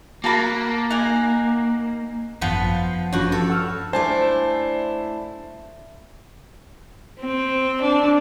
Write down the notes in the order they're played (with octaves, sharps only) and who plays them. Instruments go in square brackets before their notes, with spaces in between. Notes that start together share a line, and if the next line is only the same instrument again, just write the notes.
[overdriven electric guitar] A#3 [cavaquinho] F#4 A5 B5
[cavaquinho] D#4 F#5 G#5
[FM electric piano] G#1 F#2 F#5 [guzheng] F3 B3
[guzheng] G2 F#4 [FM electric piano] F3 C#4
[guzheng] A4
[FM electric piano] F#5 E6 F6
[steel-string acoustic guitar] A3 D4 E4 [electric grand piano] C5 G#5 A5
[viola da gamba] C4
D4